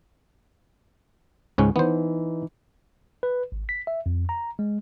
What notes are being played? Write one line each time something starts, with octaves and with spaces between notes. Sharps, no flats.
C#2 G#2 C#4
E3 B3 D#4 C5
B4
G#1
B6
E5
F2
A#5
G#3